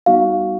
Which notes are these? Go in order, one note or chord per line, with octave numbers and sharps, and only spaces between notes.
G3 B3 D#4 F#4 F5